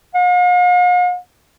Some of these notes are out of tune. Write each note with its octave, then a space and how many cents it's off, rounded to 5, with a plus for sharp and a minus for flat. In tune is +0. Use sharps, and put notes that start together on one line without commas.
F5 +45